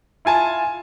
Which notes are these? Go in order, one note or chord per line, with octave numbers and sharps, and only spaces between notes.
E4 F4 G#5 A5